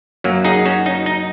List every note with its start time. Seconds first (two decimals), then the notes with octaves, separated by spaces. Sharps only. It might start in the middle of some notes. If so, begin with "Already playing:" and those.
0.24 F#2 F#3 A#3
0.44 D#4 G#4
0.65 C#4 F#4
0.86 D#4
1.06 D#4